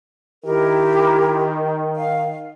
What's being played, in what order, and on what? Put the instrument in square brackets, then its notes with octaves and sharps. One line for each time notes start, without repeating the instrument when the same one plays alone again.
[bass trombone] D#3 [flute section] E4 G4 A#4
[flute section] F5